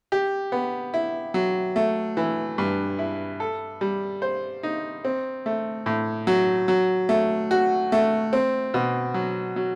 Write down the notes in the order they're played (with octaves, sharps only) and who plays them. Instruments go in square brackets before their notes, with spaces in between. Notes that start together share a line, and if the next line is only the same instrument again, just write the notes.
[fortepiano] G4
B3
E4
F#3
A3
E3
G2
E4
A4
G3
C5
D#4
C4
A3
A2
F#3
F#3
A3
F#4
A3
C4
B2
F#3
F#3